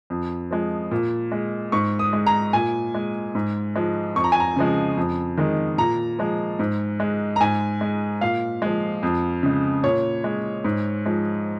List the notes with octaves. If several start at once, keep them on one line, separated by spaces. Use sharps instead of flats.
F2
F3 G#3
A#2
G#3
G#2 C#6
D#6
G#3
A#5
A#2 G#5
G#3
G#2
F3 G#3
F2 C#6
A#5
G#5
A#5
C#3 F3 G#3
F2
D#3 G#3
A#2 A#5
F3 G#3
G#2
G#3
A#5
G#2 G#5
G#3
A#2 F5
F3 G#3
F2
C#3 G#3
A#2 C#5
G#3
G#2
F3 G#3